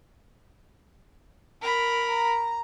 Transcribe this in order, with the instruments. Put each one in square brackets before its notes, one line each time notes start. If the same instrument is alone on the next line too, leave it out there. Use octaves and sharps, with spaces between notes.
[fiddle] A#4 B5
[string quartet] A#5